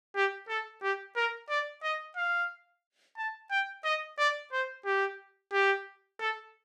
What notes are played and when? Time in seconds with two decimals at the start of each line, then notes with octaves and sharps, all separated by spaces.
0.16 G4
0.48 A4
0.82 G4
1.16 A#4
1.49 D5
1.83 D#5
2.17 F5
3.17 A5
3.51 G5
3.84 D#5
4.18 D5
4.52 C5
4.85 G4
5.53 G4
6.20 A4